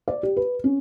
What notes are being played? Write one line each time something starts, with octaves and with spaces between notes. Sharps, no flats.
D5
G4
B4
C#4